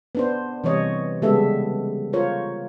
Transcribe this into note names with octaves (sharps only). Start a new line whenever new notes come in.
B3 D4 C5
C3 E3 G3 C#5 D#5
C#3 G3 G#3 B3 A4 E5
F4 A#4 C5 C#5